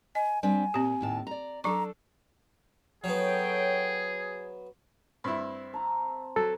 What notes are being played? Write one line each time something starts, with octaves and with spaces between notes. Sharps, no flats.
D#5 G#5
G3 C4 D4 G#5
A#2 C4 G4
D#2 A2 A5
D5 A#5
F#3 D4 A4 A#5 C#6
F#3 B3 G#4 A4 C#5 G5
G2 C4 E4
A5 A#5
F#3 A4